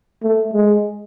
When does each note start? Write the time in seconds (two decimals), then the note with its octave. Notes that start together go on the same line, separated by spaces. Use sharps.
0.23 A3
0.53 G#3